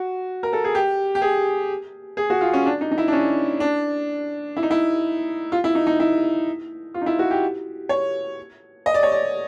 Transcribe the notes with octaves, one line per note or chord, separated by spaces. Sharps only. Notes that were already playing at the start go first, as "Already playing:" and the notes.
Already playing: F#4
A#4
A4
G#4
G4
G4
G#4
G#4
F#4
F4
C#4
D4
D#4
D#4
E4
D4
C#4
D4
E4
D#4
E4
F4
E4
D#4
D#4
E4
F4
D#4
E4
F#4
G4
C#5
D#5
D5
C#5
D5